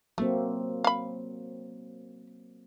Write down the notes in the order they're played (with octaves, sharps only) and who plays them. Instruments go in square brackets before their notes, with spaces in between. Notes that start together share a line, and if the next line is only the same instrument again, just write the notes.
[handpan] F#3 A#3 C4 [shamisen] A3
[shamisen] F5 B5